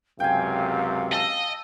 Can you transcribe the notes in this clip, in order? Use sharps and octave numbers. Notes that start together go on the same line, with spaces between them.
C#2 F#2 C3 F5 G5 G#5
D#5 A5 E6